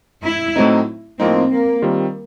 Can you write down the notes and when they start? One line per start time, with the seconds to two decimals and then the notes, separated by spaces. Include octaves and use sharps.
0.23 E4
0.56 A2 F#3 A3 C4 D#4
1.19 A2 F3 A#3 C4 D#4
1.51 A#3
1.82 D#3 G3 C4 F4